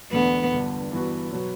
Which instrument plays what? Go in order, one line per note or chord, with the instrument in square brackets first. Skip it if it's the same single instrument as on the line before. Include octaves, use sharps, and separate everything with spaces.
[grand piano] E1 E2 D3 A3 [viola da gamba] B3
[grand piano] G1 G2 D3
G2 E3 B3 F#4
B2 F#3 B3